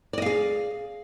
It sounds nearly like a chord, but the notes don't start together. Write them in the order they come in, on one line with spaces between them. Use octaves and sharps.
D5 D#5 F5 G#4